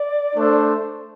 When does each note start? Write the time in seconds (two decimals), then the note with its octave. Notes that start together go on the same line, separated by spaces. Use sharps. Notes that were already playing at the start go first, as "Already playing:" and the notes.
Already playing: D5
0.35 A3 D4 A4 C5